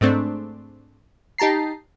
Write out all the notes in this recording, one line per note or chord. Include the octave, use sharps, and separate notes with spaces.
G#2 A3 C4 D4
D#4 G4 A5 A#5 C7